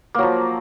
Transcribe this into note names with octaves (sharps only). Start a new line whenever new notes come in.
F3 F#3 A#3